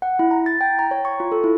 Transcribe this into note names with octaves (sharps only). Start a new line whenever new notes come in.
F#5
E4
A#5
A6
G5
A#5
C#5
C#6
F4
A4
E4